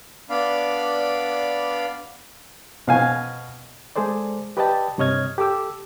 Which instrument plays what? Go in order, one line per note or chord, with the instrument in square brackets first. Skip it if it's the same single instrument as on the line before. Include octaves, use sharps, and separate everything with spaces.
[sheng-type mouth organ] B3 D4 D5 F5 B5
[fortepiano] B2 F5 G#5
[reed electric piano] G#3 G#4 A4 C5 D5
G4 B4 D5 D#5 G5 A5
G2 C3 C#5 D#5 F6 G#6
G4 A4 D6 E6